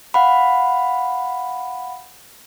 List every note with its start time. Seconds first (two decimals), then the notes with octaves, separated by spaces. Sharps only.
0.14 F5 F#5 B5